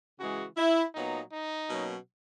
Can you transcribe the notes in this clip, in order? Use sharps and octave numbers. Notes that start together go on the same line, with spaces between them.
C#3 E3 G#3 F#4
E4
A#2 F#3 B3 D#4
D#4
B2 F#3 A#3 C#4